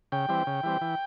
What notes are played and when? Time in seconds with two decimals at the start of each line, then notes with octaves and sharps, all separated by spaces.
0.12 C#3 G5
0.29 E3 G3 C4
0.47 C#3
0.63 E3 G3 C4
0.81 E3